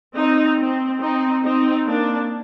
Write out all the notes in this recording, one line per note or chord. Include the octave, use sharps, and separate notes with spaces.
C4 D#4
C4
C4 D#4
C4 D#4
A#3 D4